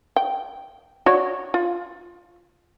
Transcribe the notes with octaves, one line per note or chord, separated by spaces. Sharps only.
G5
F#4 C#5 D5
F4